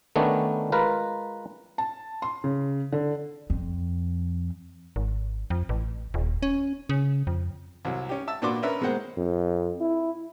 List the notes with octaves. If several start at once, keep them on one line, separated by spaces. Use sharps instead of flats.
D#3 A3 B3 C#4 D4
G#3 F4 A#4 B4
A5
C6
C#3
D3
F2
G#1
F2
A1
D#1
C#4
C#3
F2
C2 F#3
C#4 G4
E5 A5 E6
A#2 D4 F#4 B4 C6 D6
C#4 D4 A#4 B4 E5
B2 G#3 A#3 C5 F#5
F2
E4